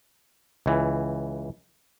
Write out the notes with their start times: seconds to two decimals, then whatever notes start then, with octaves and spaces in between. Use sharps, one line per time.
0.66 C#2 E3